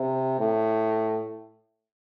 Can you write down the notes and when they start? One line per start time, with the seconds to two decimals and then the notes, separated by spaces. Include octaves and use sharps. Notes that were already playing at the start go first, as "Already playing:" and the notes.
Already playing: C3
0.39 A2